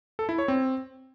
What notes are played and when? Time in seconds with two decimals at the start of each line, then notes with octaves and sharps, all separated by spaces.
0.19 A4
0.29 E4
0.38 C#5
0.48 C4